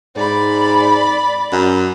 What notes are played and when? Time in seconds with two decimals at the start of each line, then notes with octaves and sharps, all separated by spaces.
0.16 G#2 D5 B5
1.52 F#2